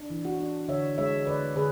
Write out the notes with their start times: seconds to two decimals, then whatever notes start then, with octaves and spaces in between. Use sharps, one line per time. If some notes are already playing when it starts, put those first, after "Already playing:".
Already playing: D4
0.10 E3
0.25 F#4
0.40 D4
0.69 D3 C#5 E5
0.98 G#3 C#5 E5
1.27 D3 B4 D5
1.56 D3 G#4 B4